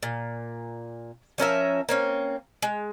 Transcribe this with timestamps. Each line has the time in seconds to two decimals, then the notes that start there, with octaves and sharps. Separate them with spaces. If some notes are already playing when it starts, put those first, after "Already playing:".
0.03 A#2
1.38 F3 C#4 A#4 E5
1.89 A#3 C4 C#4
2.62 G#3